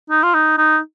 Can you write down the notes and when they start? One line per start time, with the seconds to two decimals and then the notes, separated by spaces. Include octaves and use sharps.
0.10 D#4
0.23 F4
0.34 D#4
0.58 D#4